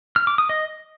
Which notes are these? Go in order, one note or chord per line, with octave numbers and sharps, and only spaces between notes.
F6
D6
D#6
D#5